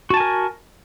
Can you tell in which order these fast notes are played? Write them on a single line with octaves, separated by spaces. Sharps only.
F#4 A5 G#5 A#4